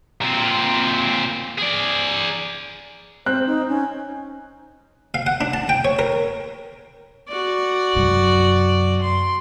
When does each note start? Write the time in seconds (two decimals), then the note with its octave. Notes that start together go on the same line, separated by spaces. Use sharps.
0.21 A#2 C4
1.58 G#4 D5
3.26 C4 C5 F#6
3.46 D#4
3.68 C#4
5.14 F5
5.27 F#5
5.41 D4
5.54 A5
5.69 G5
5.85 C#5
5.99 A#4
7.28 F#4 D5
7.95 F#2 C3
9.01 C6